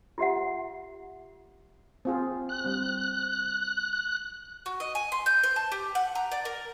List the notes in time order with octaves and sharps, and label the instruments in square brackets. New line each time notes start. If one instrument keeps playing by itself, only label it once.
[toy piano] F4 G4 E5 F#5
[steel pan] C4 F4 G#4
[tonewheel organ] F#6
[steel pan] G3 C4
[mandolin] F#4
D#5
G#5
C6
G6
C5
A5
G4
F#5
A#5
D5
A#4